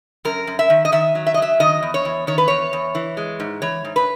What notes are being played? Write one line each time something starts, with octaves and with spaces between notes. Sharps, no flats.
F#2 A#4
F#2
E5
D#3
D#5
D#3 E5
F#3
E5
D#5
F#3 E5
D#3 D#5
E2
C#5
E2
D#3 C#5
B4
E2 C#5
E2
E3
G#3
G#2
E3 C#5
G#2
B4